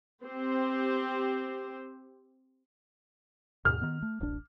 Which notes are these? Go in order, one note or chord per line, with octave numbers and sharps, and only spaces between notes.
C4 G4 C5
D#2 G#2 B2 F6
D#3 B3
A3
D1 A1 D4